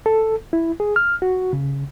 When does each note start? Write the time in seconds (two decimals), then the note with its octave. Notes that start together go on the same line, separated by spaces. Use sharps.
0.06 A4
0.53 E4
0.80 G#4
0.96 F6
1.22 F#4
1.53 C#3